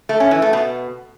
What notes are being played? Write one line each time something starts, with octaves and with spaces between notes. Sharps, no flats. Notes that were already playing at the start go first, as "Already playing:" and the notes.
A3
C#4
E3
A3
B2